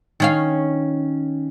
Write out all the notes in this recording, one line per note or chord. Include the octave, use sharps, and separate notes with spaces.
D#3 C#4 F5